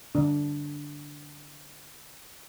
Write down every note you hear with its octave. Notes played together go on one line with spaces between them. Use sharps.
D3 D4